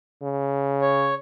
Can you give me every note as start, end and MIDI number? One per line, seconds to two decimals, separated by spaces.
0.23 1.15 49
0.82 1.14 73